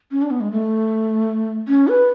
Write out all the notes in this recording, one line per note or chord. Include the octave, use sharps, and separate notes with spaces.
C#4
D4
B3
G#3
A3
C#4
B4